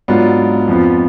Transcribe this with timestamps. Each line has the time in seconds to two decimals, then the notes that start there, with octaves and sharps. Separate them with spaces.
0.08 G#2 F#3 B3 D4 F4
0.68 F2 F3 B3 F4